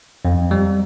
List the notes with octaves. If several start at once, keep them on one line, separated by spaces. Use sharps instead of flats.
F2
G3